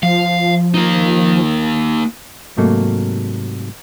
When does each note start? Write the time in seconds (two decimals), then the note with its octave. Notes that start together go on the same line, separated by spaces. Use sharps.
0.03 F3 F5
0.74 A#3 D#4
2.57 G#2 C3 F#3 A3 A#3